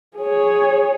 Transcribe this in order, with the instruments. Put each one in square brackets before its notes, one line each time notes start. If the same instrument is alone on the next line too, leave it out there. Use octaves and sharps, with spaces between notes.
[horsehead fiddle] G#4 C#5